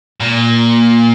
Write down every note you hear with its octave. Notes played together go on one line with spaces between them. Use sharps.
A#2